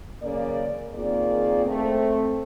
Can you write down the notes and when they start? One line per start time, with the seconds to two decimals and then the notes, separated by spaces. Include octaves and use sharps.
0.22 F#2 C#3 A#3 D5
0.95 D#3 A#3 C4 F4 G#4 D5
1.66 A3 C4